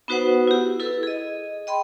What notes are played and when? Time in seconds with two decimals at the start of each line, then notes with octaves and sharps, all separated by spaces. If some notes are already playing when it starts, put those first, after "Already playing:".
0.08 B3 D#4 F#4 B4 C5 F#5
0.47 E4 G4
0.80 E4 A4 B4
1.03 G#4 D#5
1.67 D#5 G5 B5 C6